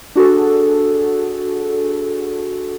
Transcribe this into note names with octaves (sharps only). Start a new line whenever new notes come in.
D4 F#4 G#4 A4